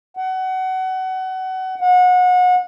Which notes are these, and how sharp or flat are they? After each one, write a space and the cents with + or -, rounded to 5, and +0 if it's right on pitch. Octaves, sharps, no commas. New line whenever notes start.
F#5 +25
F#5 -30